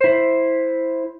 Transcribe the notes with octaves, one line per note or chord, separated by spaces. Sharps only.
E4 C5